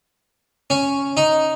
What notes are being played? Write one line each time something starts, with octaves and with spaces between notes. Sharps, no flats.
C#4
D#4